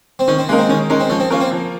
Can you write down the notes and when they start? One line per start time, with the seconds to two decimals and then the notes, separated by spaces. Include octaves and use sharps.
0.19 C4
0.28 D#3 C#4
0.38 C4
0.49 G#3 A#3 D#4 A#4
0.58 C4
0.69 D#3 C#4
0.90 G#3 C#4 D#4 A#4
1.00 C4
1.09 F3 C#4
1.20 C4
1.30 A#3 C#4 F4 A#4
1.41 C4
1.51 F3